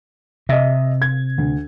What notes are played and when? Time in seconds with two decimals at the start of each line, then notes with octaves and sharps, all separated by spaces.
0.49 C3 D#5 E5
1.02 G#6
1.38 D2